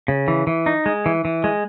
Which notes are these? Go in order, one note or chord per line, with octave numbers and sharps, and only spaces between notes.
C#3
E3
E3
D#4
G#3
E3
E3
G#3